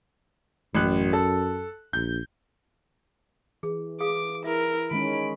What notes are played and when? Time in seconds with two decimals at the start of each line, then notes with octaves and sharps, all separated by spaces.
0.75 A1 F#2 F#6
1.13 A4
1.93 A#1 G6
3.63 E3 G#4
4.01 G#4 F5 D6 D#6
4.44 E4 A#4 E5
4.91 D#3 G#3 C#4 B5 D7